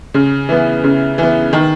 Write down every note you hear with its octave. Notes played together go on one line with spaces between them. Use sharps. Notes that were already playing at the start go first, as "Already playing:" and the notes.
C#3
E3 B3
C#3
E3 B3
D#3